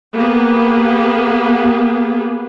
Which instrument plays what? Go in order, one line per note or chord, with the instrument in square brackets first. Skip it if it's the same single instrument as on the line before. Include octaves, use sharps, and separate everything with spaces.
[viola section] A#3 B3 G4 G#4